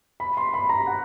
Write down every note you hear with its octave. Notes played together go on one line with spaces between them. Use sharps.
B5
C6
B5
A#5
F#5